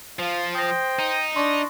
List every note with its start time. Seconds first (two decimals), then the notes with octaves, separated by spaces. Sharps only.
0.19 F3 F4
0.55 C5 G5 D#6 A#6
0.99 D#4
1.36 D4 C6 C#6